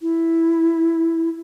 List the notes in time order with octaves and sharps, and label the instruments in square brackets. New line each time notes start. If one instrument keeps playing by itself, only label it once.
[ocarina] E4